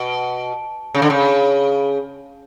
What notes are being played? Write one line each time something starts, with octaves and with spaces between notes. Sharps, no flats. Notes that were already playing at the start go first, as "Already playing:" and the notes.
Already playing: B2
C#3
D3
C#3